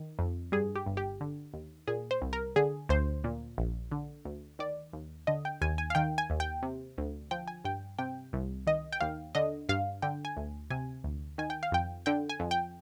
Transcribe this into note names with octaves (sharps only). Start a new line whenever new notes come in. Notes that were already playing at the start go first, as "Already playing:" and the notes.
Already playing: D#3
F2
G2 G#4
G4
G1
G4
D3
D#2
A#2 G#4
C5
C2
A#4
D3 G#4
D2 C5
A#2
A#1
D3
D2
D#3 D5
D#2
D3 D#5
G5
D#2 G#5
G#5
F5
D#3 G5
G#5
D#2
G5
C3
D2
F3 G5
G#5
G2 G5
C3 G5
C2
D#3 D#5
G5
D#2 F5
D3 D#5
G2 F5
D3 G5
G#5
D2
C3 G#5
D2
D#3 G#5
G5
F5
F2 G5
D3 G5
G#5
F2
G5